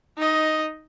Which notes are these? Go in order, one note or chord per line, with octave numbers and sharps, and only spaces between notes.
D#4 D#5